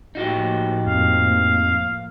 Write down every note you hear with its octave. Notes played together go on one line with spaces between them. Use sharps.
A2 F3 A#3 D#4 F#4 G4
F2 F5